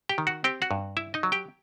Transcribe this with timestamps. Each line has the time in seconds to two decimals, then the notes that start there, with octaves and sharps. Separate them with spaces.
0.09 G4 G5
0.18 D#3
0.27 F#4 F#5
0.44 C4 G4 G5
0.62 F#4 F#5
0.71 G2
0.97 E4 E5
1.14 D#4 D#5
1.23 F#3
1.32 G4 G5